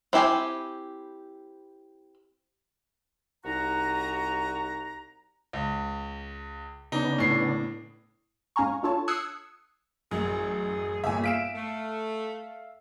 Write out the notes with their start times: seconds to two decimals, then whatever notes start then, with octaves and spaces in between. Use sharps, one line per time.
0.13 C4 E4 G4 G#5
3.45 C2 D#4 F#4 A#5
5.53 C#2
6.92 C#3 B3 D4 D#4
7.18 A2 C7
8.56 G#2 C#4 F5 G#5 A#5 C#6
8.83 D4 F4 A4 C#5 A5
9.08 D#6 E6 F#6 G#6 C7 C#7
10.11 A1 F#2 G#4
11.04 G1 A#2 E5 G#5
11.24 E5 F5 B6 D7 E7
11.55 A3